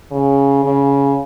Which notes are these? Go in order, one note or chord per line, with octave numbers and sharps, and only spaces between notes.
C#3
C#3